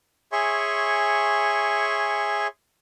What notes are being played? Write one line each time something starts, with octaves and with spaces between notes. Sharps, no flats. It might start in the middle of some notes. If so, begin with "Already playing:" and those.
G#4 C#5 E5 G#5 C6 C#6